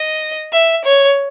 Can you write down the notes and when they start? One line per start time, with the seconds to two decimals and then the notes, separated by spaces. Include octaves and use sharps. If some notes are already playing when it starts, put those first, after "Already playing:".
Already playing: D#5
0.52 E5
0.85 C#5